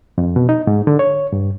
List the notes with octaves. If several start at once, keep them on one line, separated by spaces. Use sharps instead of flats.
F2
B2
D#4
G#2
D3
C#5
G2